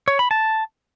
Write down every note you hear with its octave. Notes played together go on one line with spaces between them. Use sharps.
C#5
B5
A5